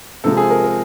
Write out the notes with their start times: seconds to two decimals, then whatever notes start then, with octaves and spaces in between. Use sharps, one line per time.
0.24 C3 F3 G#3 A4
0.37 G#4
0.50 A#4
0.63 A#4